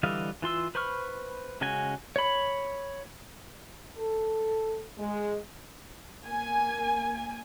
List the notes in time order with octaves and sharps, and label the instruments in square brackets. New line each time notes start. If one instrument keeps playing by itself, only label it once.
[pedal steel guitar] D3 E3 G3 D#5 F5
E3 F4 C6 E6
B4 C5 B5 C#6 F6
C#3 G#3 C#4 F#4 G#5
C#5 B5
[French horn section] A4
G#3
[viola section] A#3 G#5